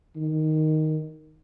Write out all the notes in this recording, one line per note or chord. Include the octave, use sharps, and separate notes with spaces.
D#3